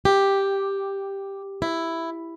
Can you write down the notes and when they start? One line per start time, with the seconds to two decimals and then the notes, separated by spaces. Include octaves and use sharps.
0.05 G4
1.62 E4